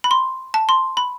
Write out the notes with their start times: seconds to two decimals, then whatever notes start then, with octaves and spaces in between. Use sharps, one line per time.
0.04 B5
0.11 C6
0.54 A5
0.69 C6
0.97 B5